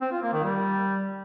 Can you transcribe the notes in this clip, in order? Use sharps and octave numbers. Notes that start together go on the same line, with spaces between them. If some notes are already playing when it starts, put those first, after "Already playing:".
C4
F4
A#3
D#3
G3